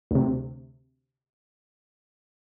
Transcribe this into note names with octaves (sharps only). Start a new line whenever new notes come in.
D2 C3